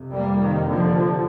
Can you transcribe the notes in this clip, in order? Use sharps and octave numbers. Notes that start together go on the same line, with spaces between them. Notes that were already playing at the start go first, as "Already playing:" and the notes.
Already playing: F2 C3
G3 A#3
D#3
D3 F3